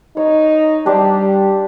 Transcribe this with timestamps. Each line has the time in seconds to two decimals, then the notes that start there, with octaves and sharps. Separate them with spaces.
0.17 D#4 C#5
0.86 G3 D4 G4 C5